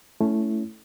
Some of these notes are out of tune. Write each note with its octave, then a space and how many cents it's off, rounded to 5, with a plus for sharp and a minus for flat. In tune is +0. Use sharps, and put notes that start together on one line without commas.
A3 +0 C#4 +15 E4 +0